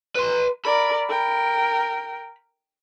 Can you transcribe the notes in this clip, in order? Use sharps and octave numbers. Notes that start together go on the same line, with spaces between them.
B4 C6
A#4 D5 B5
A#4 G5